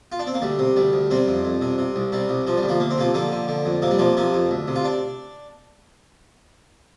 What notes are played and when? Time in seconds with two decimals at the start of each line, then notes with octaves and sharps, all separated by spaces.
0.12 F4
0.19 D4
0.27 C4
0.34 A#3
0.42 D2 G3
0.59 C3
0.76 D2 G3
0.93 D2
1.11 C3 G3 C4
1.27 F2
1.44 F2
1.61 C3
1.78 C3
1.96 C2
2.12 C3 G3
2.29 C2
2.47 C3 F3
2.57 G3
2.63 D2
2.69 F3 A#3
2.80 D2 A#3
2.90 C4
2.98 C3 F3 A#3
3.14 D3 F3 A#3
3.32 D3
3.48 D3
3.65 F2
3.82 C3 A#3
3.91 G3
3.99 C3 F3 A#3
4.17 C3 F3 A#3
4.34 F2
4.51 D2
4.68 C3
4.76 F4
4.84 D4